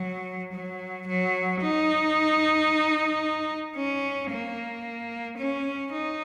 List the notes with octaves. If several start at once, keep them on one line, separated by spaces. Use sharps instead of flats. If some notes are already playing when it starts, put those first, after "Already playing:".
Already playing: F#3
F#3
F#3
D#4
C#4
A#3
C#4
D#4